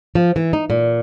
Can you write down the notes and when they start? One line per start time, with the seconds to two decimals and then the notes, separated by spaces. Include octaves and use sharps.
0.15 F3
0.36 E3
0.53 D#4
0.70 A#2